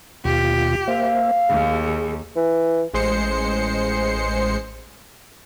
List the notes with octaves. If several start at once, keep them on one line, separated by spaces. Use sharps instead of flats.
D#2 B2 F4 G4
A#3 C5 E5 F5
D#2 G#4
E3
A1 G#3 C5 C7 C#7